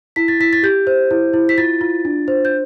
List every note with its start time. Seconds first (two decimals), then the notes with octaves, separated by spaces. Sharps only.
0.16 E4 B6
0.28 A6
0.40 E4 B6
0.53 A6
0.63 G4 G6
0.87 C5
1.11 E4
1.33 E4
1.49 B6
1.58 F4 A6
1.81 F4
2.05 D4
2.28 C5
2.45 G6